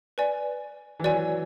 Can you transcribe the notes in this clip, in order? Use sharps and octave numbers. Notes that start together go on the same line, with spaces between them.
B4 D5 G#5
E3
F#3 B4 D5 G#5